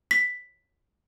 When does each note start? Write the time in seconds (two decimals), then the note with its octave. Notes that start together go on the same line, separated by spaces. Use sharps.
0.11 B6